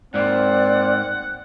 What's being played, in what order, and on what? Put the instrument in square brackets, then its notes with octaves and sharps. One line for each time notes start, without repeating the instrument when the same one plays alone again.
[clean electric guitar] G#2 A#3 [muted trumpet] C4 [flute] D5 [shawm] F#5